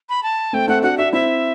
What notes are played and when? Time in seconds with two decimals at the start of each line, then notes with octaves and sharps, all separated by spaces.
0.09 B5
0.23 A5
0.53 A3 C4 G5
0.68 A3 C4 F#5
0.83 D4 F#4 F#5
0.98 D4 F#4 E5
1.13 C4 E4 E5